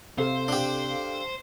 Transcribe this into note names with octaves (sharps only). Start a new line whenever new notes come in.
C3 A4 C5 F5
D4 G4